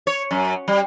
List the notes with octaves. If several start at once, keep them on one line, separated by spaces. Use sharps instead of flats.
C#5
F#2
G3